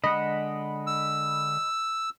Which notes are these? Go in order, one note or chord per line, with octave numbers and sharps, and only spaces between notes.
D3 G#3 D#5 F#5 B5
E6